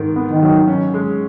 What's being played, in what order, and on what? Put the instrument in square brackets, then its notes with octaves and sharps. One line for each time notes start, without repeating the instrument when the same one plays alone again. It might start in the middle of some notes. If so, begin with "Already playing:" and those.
Already playing: [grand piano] G#2 D#3
B3
[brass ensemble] D#3
[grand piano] F#3
C#4
G#3